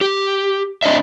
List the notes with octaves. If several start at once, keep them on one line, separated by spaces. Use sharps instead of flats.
G4
C4 D4 D#5 E5